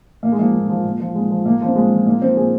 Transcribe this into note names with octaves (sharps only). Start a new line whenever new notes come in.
A#2 A#3
G#3
F3 A#3
A#2
F3
A#2
F3
A#2 G#3
F3
A#2 A#3
F3 C4
A#2 G#3
F3
A#2 A#3
F3 C4
A#2 G#4